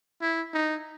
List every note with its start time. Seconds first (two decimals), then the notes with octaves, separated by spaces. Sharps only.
0.22 E4
0.54 D#4